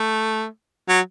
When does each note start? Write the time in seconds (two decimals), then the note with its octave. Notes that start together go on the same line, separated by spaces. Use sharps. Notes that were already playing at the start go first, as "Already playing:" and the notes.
Already playing: A3
0.89 F#3